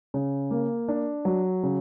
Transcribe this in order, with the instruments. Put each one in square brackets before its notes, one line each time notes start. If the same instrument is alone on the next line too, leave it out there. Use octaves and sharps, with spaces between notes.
[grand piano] C#3
A#3
D4
F#3
C#3